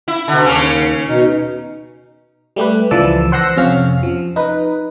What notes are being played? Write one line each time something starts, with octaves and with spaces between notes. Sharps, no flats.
E4
B2 D3
D#2 C#3 C#4 C#5
B2 D#4
G3 A3 G4 B4
C#2 E3 F3 D5 A5 E6
C5 F#5 C6 E6 A#6
F2 C3 C#4 F5 F6
F3
D#4 B4